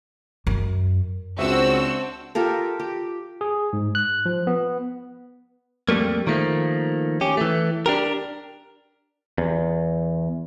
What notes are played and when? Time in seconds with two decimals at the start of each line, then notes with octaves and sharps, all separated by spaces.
0.47 F#2
1.38 C#2 C4 D4 F#4 C5 E5 E6
2.35 F4 G4 A4 A#4
2.80 G4
3.41 G#4
3.73 G#2
3.95 F#6
4.26 F3
4.47 B3
5.89 F2 G3 A3 A#3
6.27 D#3 F3 A3 A#3
7.21 C#4 G4
7.37 E3 A3
7.86 D4 G4 A#4
9.38 E2